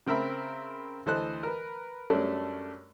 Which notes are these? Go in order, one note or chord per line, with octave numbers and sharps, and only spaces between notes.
C#3 C4 A#4 E5 B5
D2 E3 A4 C5 D#5 F#6
A#4 B4
F#2 G3 A3 C#4 D4